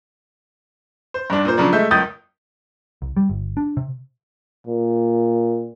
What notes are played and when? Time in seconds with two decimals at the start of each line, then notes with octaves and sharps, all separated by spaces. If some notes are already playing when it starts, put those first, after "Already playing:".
1.14 C5
1.30 G2 D4
1.45 A#2 C5
1.57 C#3 F3 F#3 D4
1.72 G#3 A3 E5 G6
1.91 F#1 C#2 D#6 G6 A6
3.02 C2
3.17 G3
3.29 G1
3.57 D4
3.77 C3
4.67 A#2